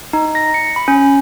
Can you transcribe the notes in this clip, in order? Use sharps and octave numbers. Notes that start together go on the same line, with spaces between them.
D#4
A#6
C#7
B5
C#4